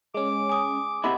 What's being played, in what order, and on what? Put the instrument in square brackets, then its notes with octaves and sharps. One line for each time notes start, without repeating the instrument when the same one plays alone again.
[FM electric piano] G#3 C#4 [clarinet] D6
[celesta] G#5 D#6
[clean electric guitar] C3 E4 [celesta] D#5 F#5